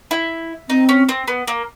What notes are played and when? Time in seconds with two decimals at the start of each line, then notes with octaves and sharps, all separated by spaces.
0.11 E4
0.69 C4 D#4
0.89 C#4
1.09 C4
1.28 B3
1.47 A#3